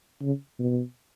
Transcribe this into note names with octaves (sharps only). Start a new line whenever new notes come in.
C#3
B2